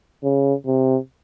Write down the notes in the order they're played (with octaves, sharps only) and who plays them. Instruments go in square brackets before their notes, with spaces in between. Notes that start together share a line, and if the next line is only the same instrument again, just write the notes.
[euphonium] C#3
C3